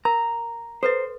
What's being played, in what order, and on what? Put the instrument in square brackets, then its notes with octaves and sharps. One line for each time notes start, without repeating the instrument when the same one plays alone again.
[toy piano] A#4 [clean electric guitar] A#5
[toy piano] A4 B4 D#5 [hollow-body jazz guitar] C5